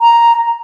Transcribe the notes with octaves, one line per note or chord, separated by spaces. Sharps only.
A#5